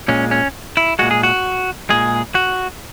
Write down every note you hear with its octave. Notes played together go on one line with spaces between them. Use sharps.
A#2 G#3 C#4
C#4
E4
A#2 G#3 F#4
G#4
F#4
A#2 G#3 G#4
F#4